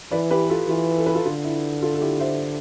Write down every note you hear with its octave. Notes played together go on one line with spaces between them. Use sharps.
E3 B4 D5
G4 B4
F4 A4
E3 F4
A4
B4
F4 A4
D3 F4
E4
F4 A4
A4
E4 G4
C5 E5